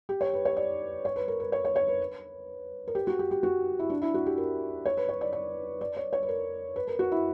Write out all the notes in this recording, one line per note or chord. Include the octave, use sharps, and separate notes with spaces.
G4
C#5
B4
C#5
D5
C#5
B4
A#4
B4
C#5
C#5
C#5
B4
A#4
G4
F#4
G4
G4
F#4
E4
D4
E4
F#4
G4
A#4
C#5
B4
C#5
D5
D5
D5
C#5
C#5
B4
A#4
B4
A#4
F#4
E4